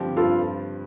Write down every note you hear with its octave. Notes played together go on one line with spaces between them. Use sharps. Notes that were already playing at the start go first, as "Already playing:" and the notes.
Already playing: G2 D3 F3 C4 G4
G2 F4 A4